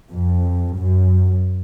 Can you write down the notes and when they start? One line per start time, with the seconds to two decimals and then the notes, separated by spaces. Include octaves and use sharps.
0.11 F2
0.77 F#2